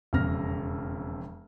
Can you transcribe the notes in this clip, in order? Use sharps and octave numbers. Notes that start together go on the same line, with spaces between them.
E1 F2 C#3 F6 A#6